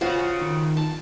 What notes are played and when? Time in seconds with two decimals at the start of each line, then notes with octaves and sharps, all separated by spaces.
0.01 C#3 F4 F#4 C5 F#5
0.41 D#3
0.77 A5